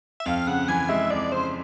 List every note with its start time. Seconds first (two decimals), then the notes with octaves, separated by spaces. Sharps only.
0.20 E5
0.26 F2 F5
0.47 C#3 F#5
0.68 E3 G#5
0.89 G#3 E5
1.10 F2 D5
1.32 C#3 C5